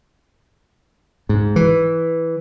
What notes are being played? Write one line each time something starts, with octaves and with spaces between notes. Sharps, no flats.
G#2
E3